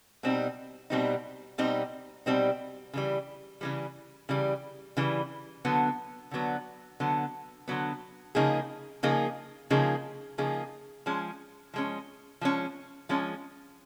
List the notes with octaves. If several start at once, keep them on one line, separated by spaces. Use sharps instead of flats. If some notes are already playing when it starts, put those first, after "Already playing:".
B2 G3 C4 D#4
B2 G3 C4 D#4
B2 G3 C4 D#4
B2 G3 C4 D#4
C#3 E3 G3
C#3 E3 G3
C#3 E3 G3
C#3 E3 G3
D3 F#3 B3
D3 F#3 B3
D3 F#3 B3
D3 F#3 B3
C#3 F3 A#3 D#4 G#4
C#3 F3 A#3 D#4 G#4
C#3 F3 A#3 D#4 G#4
C#3 F3 A#3 D#4 G#4
F3 G#3 C#4
F3 G#3 C#4
F3 G#3 C#4
F3 G#3 C#4